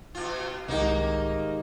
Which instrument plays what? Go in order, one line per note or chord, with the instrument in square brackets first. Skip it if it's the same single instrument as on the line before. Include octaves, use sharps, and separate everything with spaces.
[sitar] B2 F4
[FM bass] C2 [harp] G#2 C3 D#3 [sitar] A#3 D#4